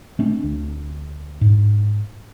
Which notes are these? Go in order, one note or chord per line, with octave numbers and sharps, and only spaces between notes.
A3 C4 D4
D2
G#2